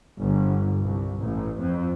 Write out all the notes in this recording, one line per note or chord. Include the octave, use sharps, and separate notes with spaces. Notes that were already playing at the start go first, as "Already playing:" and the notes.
G1
C2
A1
F2